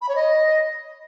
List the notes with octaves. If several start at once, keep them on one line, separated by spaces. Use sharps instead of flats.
B5
C#5
D#5